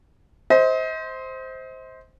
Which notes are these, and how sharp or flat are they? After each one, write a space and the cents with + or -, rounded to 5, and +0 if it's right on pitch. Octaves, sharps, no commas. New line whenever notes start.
C5 +0 D#5 +40